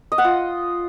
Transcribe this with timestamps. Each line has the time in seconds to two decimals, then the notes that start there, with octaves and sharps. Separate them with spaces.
0.12 D#5
0.18 F#5
0.24 F4